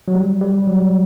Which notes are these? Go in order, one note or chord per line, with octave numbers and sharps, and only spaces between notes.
F#3
G3
G3
F#3